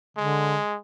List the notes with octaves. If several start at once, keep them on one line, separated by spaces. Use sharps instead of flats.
D3 G#3